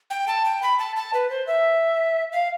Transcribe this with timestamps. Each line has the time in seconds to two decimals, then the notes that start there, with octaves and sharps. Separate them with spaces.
0.10 G5
0.28 A5
0.45 G5
0.62 B5
0.79 A5
0.96 A5
1.14 B4
1.30 C5
1.47 E5
2.32 F5